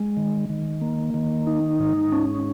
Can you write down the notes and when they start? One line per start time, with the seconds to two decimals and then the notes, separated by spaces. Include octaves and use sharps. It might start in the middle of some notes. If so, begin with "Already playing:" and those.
Already playing: G#3
0.17 D#3
0.50 D#3
0.81 A#3
1.14 D#3
1.47 D#4
1.79 G#2
2.12 C#4